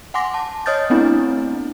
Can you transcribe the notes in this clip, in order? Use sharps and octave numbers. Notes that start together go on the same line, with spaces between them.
F#5 G#5 C6 D6 A#6
A5
C#5 D#5 D#6 F6 G6 A6
A3 B3 C4 D4 E4